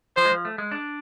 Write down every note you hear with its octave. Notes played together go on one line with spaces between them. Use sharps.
F3 C5
G#3
F3
A3
G#3
D4